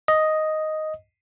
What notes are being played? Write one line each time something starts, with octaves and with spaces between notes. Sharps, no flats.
D#5